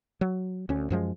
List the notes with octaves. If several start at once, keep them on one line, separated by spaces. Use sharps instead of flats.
F#3
D2 C#4
F#2 F3 G#3